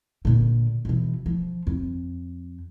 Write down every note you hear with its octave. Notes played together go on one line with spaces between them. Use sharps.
A#2 D3
B2 E3
F3
F2